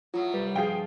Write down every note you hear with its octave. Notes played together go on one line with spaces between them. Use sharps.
A2 F#3 F4
C2 G3 B4
G2 F3 G#4 F5 G5